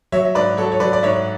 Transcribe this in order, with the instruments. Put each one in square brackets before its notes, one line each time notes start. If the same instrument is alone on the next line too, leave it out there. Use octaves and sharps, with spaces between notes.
[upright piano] F#3 C#5 E5
E5
G#2 B4 D5
F#3 A4 C#5
C#5
F#3 B4 D5
D5
G#2 C#5 E5